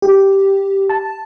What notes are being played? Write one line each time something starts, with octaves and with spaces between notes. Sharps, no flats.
G4
A5